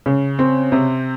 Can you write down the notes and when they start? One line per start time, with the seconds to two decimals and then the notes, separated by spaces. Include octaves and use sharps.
0.06 C#3
0.39 C4
0.72 C3